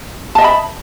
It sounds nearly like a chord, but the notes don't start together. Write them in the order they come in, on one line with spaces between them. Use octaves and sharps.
A5 D#5 E5 B5